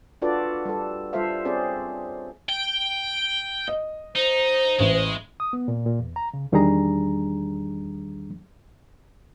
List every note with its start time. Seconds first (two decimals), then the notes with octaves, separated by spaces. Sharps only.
0.22 D4 F4 F#4 A4 B4 D5
0.65 G3 A4
1.13 G3 F4 A4 C5 E5 F5
1.45 C4 C#4 G#4 C5 D5
2.49 G5
3.68 D#5
4.15 D#4 C5
4.80 A1 G#3
5.40 D#6
5.53 B3
5.68 A#2
5.86 A#2
5.99 E2
6.16 A#5
6.34 C#3
6.52 E2 D#3 G3 D4 G#4 A#5